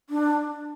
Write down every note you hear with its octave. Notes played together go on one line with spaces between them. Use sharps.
D4